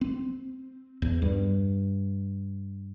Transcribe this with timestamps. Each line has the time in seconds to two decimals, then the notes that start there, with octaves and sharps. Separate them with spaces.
0.01 C4
1.02 E2
1.22 G2